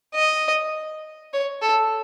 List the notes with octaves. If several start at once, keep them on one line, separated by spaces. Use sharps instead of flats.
D#5
C#5
A4